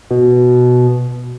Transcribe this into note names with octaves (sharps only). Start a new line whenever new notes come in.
B2